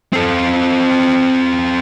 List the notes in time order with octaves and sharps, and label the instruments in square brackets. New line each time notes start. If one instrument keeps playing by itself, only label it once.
[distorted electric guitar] C4 A4